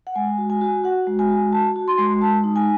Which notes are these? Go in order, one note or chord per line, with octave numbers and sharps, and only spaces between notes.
F#5
G#3 G#5
F#4
G#5
F#4
F#4 F#5
G#3
G#5
F#4
F#4 A5
F#4
C6
G#3
G#3 A5
D#4
G#5